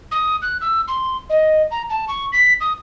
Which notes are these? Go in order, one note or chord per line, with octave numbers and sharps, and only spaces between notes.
D#6
F#6
E6
C6
D#5
A#5
A5
C#6
B6
D#6